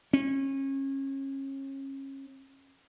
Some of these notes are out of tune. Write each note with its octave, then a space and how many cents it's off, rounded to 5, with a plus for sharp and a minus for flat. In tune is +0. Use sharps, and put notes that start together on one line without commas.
C#4 -30